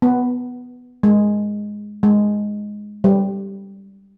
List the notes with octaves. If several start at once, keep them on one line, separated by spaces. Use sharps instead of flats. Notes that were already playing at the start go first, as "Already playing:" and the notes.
B3
G#3
G#3
G3